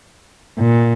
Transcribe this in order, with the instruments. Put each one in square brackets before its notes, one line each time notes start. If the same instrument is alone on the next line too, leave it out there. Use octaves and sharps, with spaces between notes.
[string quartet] A#2